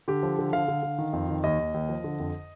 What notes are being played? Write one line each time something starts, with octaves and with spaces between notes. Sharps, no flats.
D3 G4
F3
D3
D3 F5
D3
D3
D#3
F2
D#3
D#2 D#5
D#2
D#2
F3
D3
F2